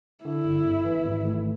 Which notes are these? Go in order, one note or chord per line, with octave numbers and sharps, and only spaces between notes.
D3 E4
G1
G1
E3
G#1
A3